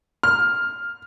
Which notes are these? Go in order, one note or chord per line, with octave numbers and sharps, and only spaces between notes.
F6